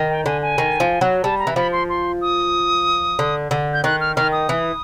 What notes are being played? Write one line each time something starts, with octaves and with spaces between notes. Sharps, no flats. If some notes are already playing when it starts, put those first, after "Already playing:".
Already playing: D#3
G5
D3 G#5
G#5
D#3
F3
F#3
G3 A5
A#5
E3
F3 B5
C6
C6
D#6
D3
D3
G6
D#3 F#6
F6
D#3 F6
D#6
E3